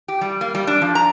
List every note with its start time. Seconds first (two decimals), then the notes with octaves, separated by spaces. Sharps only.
0.08 G4
0.21 G3
0.41 A#3
0.55 G3
0.67 D4
0.82 F3
0.95 A#5